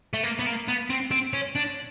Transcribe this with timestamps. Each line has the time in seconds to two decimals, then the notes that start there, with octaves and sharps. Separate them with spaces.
0.14 A3
0.23 A#3
0.39 B3
0.46 A#3
0.68 B3
0.90 C4
1.11 C4
1.34 C#4
1.56 D4